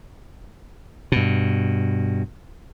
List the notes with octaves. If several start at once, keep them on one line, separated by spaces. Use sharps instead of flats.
G2 B2